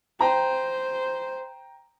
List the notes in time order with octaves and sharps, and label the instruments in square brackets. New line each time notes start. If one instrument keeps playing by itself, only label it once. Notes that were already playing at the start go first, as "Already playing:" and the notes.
[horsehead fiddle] C5 [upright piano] G5 A#5